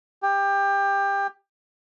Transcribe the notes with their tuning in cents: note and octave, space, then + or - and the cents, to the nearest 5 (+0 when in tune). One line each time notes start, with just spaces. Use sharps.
G4 +20